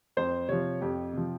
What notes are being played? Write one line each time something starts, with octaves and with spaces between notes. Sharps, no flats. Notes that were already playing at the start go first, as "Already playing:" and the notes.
F2 C5
C3 F3 C#5
F2 G4
C3 F3